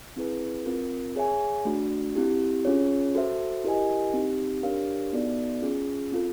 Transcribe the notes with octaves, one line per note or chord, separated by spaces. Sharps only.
C4 E4 G#4 B4
C4 F4 A#4
G#4 C#5 E5 G#5
A3 D4 F#4
C4 E4 G4
C#4 F4 G#4 C#5
F#4 A4 C5 E5
E4 G4 A#4 D#5 G#5
C4 D#4 G4
D4 G4 A#4 C#5 F5
B3 D#4 F#4 A4 D5
C#4 F4 G#4
C4 F4 A4